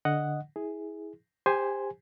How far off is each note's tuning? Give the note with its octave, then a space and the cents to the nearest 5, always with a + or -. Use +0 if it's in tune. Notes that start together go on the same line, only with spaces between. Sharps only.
D3 +0 D#5 +0 F#5 +0
E4 -25 G#4 +0
G4 +30 C5 +0 G#5 +0